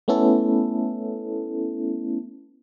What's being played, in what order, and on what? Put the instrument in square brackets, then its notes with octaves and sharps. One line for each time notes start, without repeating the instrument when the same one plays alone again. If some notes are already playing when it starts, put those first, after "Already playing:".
[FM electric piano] A3 B3 C#4 E4 A4